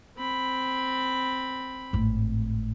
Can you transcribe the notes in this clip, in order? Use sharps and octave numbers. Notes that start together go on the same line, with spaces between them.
C4 B5
G#1 A2